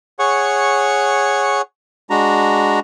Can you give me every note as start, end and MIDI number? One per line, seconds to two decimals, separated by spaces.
0.19 1.62 68
0.19 1.62 73
0.19 1.62 78
0.19 1.62 85
2.10 2.80 56
2.10 2.80 62
2.10 2.80 66
2.10 2.80 82